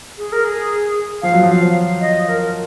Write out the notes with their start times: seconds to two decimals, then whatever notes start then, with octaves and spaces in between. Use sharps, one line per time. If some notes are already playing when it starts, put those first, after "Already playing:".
0.18 G#4
0.32 A#4
0.45 G#4
1.22 F3 F5
1.33 F#3
1.43 F3
1.49 F5
2.01 D#5
2.28 A#4